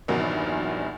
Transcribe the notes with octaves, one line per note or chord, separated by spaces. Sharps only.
A#1 E2 G2 D#3 F#3